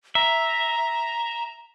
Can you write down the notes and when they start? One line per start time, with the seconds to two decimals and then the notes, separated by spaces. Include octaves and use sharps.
0.15 E5 A#5